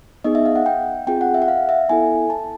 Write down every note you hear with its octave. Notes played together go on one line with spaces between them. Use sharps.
B3 D#4 G#4 D#5
E5
F5
F#5
G5
C4 F4 G#4 G5
F#5
E5
F#5
F5
E5
B3 E4 A4 G#5
A5